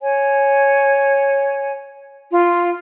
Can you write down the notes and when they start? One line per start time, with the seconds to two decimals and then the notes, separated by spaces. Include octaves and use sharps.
0.01 C#5 G#5
2.31 F4